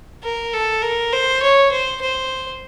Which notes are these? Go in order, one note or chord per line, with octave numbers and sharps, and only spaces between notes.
A#4
A4
A#4
C5
C#5
C5
C5